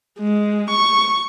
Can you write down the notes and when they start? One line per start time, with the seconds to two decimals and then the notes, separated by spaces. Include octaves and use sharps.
0.20 G#3
0.70 C#6